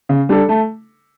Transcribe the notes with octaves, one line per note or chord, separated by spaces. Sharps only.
C#3
G3 D4 A4
A3